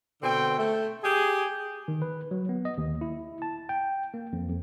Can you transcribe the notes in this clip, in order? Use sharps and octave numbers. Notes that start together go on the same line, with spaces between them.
B2 D3 C4 G5
A3
G4 G#4
D#3
B4
F#3
B3
D#5
D#2
E4
A5
G5
A#3
F2
F2